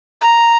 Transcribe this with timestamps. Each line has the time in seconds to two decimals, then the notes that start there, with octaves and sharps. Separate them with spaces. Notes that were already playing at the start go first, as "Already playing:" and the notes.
0.21 A#5